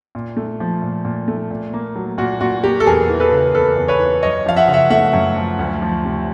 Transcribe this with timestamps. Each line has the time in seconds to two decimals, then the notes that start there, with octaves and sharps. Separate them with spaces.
0.15 A#2
0.37 A3
0.60 F3
0.82 A#2
1.05 A#2
1.28 A3
1.51 A#2
1.73 A#3
1.96 F#3
2.18 A#2 F#4
2.41 A#2 F#4
2.64 A#3 G4
2.80 A4
2.87 E2 G#4 A#4
3.09 E3
3.20 A4 B4
3.32 C#3
3.54 E2 A4 B4
3.77 E2
3.88 B4 C#5
3.99 E3
4.23 F#2 C#5 D#5
4.46 F3 F5
4.56 E5 F#5
4.68 C#3
4.73 E5 F#5
4.90 A3 E5 F#5
5.13 F#2
5.36 F3
5.59 D2
5.82 F3
6.05 C3